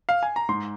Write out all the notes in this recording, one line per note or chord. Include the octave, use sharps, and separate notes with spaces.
F5
G#5
A#5
G#2 C6